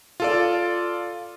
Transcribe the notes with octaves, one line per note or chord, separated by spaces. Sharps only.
F4 A4 D5